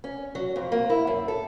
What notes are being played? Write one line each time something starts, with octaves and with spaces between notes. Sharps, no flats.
C#4
F#3
F2
A#3
E4
F#2
A4